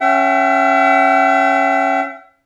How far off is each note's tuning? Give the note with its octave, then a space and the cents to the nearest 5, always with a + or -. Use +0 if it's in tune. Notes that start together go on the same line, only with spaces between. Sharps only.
C#4 -15 E5 +30 G5 -45